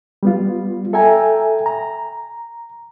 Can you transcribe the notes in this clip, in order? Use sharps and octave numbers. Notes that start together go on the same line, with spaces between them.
G3 B3 F4
A4 E5 G5 G#5 A#5
A#5